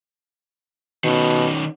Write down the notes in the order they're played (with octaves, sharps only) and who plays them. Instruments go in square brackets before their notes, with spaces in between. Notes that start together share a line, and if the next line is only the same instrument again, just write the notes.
[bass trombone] B2 [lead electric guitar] D#3 C#4